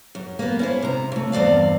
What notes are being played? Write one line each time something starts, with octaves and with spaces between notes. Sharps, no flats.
F#2
A#3 B3
C#4 E4 C5
C3 A#5
C#3 A3
E2 G2 C4 D5 F5